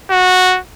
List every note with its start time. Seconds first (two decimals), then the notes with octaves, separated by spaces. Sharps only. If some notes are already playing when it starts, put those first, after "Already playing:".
0.10 F#4